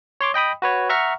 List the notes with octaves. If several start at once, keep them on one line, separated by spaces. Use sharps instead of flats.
C#5 C6 D6
D#5 G5 B5 D#6
F#4 B4 C#5
E5 F#5 A#5 C#6 F6